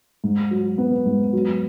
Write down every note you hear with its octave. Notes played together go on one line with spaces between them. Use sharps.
G#2
F#3
B3
G#2
F#3